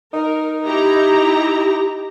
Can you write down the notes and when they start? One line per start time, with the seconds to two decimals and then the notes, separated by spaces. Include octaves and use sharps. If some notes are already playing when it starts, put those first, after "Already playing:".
0.13 D#4 A#4
0.65 E4 G4 A#5